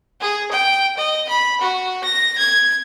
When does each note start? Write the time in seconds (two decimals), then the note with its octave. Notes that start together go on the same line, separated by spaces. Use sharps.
0.21 G#4
0.51 G5
0.97 D#5
1.28 B5
1.60 F#4
2.04 A#6
2.37 G#6